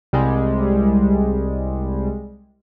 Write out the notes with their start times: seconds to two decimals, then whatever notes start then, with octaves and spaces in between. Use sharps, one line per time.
0.13 C2 G3 G#3